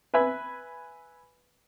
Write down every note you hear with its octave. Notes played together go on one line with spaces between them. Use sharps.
B4 E5 G#5 B5